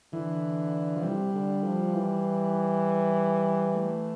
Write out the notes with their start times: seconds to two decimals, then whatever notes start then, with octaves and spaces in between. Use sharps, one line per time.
0.13 D3 E3
0.96 F3
1.03 C3 G3
1.34 D3
1.64 F3
1.94 E3
3.75 A3